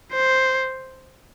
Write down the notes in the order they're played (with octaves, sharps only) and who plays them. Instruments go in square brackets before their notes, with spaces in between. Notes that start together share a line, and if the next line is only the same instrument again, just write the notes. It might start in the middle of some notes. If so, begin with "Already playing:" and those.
[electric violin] C5